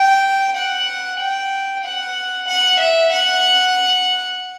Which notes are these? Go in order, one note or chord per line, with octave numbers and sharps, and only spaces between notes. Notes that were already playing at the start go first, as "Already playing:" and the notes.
Already playing: G5
F#5
G5
F#5
F#5
E5
F#5